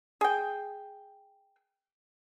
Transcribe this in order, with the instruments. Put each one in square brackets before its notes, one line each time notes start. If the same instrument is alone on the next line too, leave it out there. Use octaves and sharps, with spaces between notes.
[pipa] G#4 G5